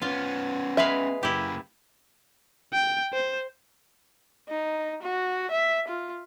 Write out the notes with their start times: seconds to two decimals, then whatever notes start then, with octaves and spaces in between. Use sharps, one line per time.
0.02 B3 C#4 F4 F5
0.77 G#3 B4 E5 F5
1.23 F#2 A#3 E4 G4
2.73 G5
3.13 C5
4.49 D#4
5.03 F#4
5.51 E5
5.88 F4